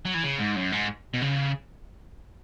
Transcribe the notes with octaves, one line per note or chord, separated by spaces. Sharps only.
F#3
E3
C#3
G#2
F#2
G#2
B2
C#3